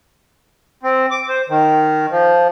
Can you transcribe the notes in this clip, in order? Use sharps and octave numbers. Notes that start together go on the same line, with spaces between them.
C4
D6
C5
D#3
F3